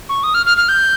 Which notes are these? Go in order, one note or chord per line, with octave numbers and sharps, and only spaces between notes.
C#6
D#6
F6
F6
F6
G6